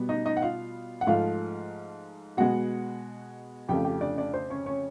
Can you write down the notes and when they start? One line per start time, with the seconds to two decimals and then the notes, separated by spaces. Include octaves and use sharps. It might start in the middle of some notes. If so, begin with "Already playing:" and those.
Already playing: B2 G3 B3
0.09 D#4 D#5
0.26 D#4 D#5
0.37 F#5
0.42 F4 F5
1.01 F#5
1.07 G#2 F3 A3 F4 F5
2.37 B2 G#3 B3 F#4 F#5
3.68 F2 C#3 F3 A3 G4 G5
3.85 G4 G5
4.01 D4 D5
4.18 D4 D5
4.34 C5
4.50 C#4 C#5
4.66 C#4 C#5